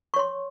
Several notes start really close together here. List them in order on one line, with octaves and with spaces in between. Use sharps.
C#6 C#5 C6